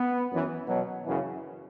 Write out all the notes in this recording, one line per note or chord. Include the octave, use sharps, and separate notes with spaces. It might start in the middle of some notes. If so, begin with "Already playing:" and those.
Already playing: B3
F#2 E3
B2 F#3
F#2 C#3 E3